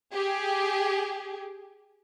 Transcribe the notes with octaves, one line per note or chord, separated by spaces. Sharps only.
G4 G#4